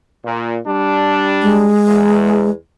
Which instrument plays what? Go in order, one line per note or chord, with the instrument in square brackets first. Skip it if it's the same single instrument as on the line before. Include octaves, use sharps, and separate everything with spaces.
[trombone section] A#2
G3 D4
[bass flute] G#3
[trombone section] E2